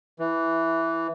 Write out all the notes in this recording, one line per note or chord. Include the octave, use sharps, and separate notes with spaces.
E3